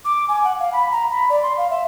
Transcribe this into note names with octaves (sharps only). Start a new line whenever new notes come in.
D6
G#5
F#5
F5
B5
A#5
B5
D5
C6
F5
E5